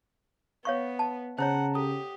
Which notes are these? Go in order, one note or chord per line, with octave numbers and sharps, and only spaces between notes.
B3 C#5 F5 C#6
A5
C#3 C5 C#5 F#5 A5 A#5
G4 A4 D#6